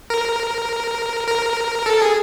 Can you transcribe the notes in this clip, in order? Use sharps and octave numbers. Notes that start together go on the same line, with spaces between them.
A#4
A#4
A4
G#4